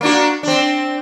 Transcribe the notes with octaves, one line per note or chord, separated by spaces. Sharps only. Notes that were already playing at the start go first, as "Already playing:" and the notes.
A#3 D4 F#4
C4 D4